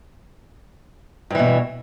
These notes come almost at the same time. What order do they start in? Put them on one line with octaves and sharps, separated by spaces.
G2 E3 B2